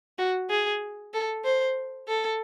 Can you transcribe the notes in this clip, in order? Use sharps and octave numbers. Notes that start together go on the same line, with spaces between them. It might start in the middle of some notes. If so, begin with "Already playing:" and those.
F#4
G#4
A4
C5
A4